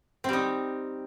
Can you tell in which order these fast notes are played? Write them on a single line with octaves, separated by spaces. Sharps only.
C4 G3 D#4